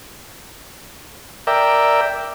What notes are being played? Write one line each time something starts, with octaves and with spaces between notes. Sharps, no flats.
A#4 D5 E5 G5